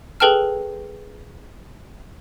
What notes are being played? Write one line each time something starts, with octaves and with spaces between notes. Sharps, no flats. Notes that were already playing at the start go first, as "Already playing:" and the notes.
G#4 A4 B4 G5 A5 F6